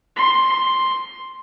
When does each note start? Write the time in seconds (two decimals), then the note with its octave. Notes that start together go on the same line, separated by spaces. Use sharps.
0.16 C6